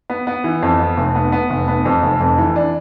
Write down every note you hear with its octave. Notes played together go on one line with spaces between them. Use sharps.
B3
B3
E3
F2
B3
F1
B3
B3
F1
B3
F2
F1
F2
E3
D4